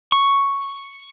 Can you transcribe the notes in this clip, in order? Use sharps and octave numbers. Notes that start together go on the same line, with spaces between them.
C#6